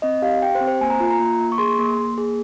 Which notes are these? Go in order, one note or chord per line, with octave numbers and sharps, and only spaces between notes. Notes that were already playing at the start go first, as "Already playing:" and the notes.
C4 D#5
G4 F5
G4 G5
C5
C4
C5
A#3 G#5
A#5
F4
A#5
A#3
A#3
C#6
G#4 C6
A#3
A#3
G#4